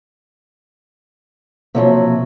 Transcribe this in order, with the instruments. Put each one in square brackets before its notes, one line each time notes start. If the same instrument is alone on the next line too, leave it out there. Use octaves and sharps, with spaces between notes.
[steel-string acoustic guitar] C3 F3 F#3 [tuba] A#3